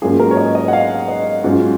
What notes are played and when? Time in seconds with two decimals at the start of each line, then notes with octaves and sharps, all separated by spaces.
0.02 G#2 F#3 A#3 C#4 F4 G#4
0.20 A#4
0.31 C#5
0.37 D#5
0.55 D#5
0.68 F#5
0.73 F5
1.08 D#5
1.44 G#2 F#3 C#4 F4